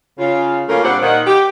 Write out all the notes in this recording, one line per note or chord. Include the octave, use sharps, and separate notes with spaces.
C#3 F4
C#3 A3 A#3 C#4 F4 A#4
A#2 G3 C4 D4 C5 F#5
A#2 D#3 F#5
G4